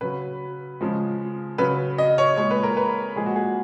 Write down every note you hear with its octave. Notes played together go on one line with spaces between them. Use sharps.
C#3 F#3 B4
C#3 F3 G#3
C#3 F#3 B4
D#5
C#5
A#2 G#3 C#5
B4
A#4
B4
A#2 F3 G#3 G#4
F#4
G#4